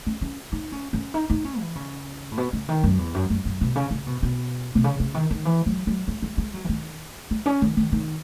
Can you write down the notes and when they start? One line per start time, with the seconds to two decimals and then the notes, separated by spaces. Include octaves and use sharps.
0.07 C#4
0.21 C#4
0.52 D#4
0.72 C#4
0.93 C#4
1.14 D#4
1.30 D#4
1.45 C#4
1.60 E3
1.75 C#3
2.31 A2
2.38 B2
2.53 C#3
2.69 D#3
2.83 F#2
2.99 E2
3.14 F#2
3.30 F#2
3.45 F#2
3.61 B2
3.76 C#3
3.91 C#3
4.07 B2
4.23 B2
4.75 B2
4.84 C#3
5.00 C#3
5.14 D#3
5.31 D#3
5.45 E3
5.66 F#3
5.87 F#3
6.07 G#3
6.22 G#3
6.38 G#3
6.54 F#3
6.64 E3
6.69 D#3
7.31 G#3
7.46 C#4
7.62 D#3
7.77 D#3
7.92 D#3